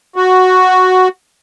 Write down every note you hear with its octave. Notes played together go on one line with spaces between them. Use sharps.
F#4